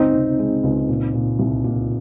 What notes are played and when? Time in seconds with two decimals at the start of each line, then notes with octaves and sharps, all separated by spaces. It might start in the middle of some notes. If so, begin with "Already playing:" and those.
Already playing: C#2 C4 D#4
0.13 C3
0.39 G#3
0.63 C#2
0.88 A#2
1.14 A#2
1.39 C2
1.64 A#2